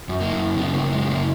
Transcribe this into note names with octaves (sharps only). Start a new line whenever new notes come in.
F#2
A#3
F#2
C#3 B3
A#3
F#2
G#3
C#3
A#3